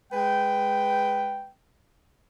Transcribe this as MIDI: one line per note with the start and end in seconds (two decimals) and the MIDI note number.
0.12 1.50 56
0.12 1.50 71
0.12 1.50 79